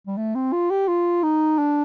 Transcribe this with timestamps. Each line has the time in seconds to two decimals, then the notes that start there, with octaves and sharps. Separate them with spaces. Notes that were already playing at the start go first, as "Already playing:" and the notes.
0.07 G3
0.17 A3
0.35 C4
0.53 F4
0.70 G4
0.88 F4
1.23 D#4
1.59 D4